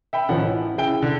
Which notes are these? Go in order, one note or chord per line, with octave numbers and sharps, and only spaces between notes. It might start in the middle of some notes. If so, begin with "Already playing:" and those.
E5 G5 B5
A1 D#3 F3 C#4 F#5
E3
C#3 E4 G5 D7 G7
D3